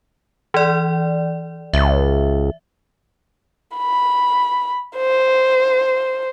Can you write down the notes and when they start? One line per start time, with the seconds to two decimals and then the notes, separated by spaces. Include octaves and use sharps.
0.54 E3 D5
1.74 C#2 E5
3.77 B5
4.97 C5